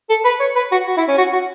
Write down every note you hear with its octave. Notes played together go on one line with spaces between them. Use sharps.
A4
B4
C#5
B4
F#4
F#4
E4
C#4
F#4
F#4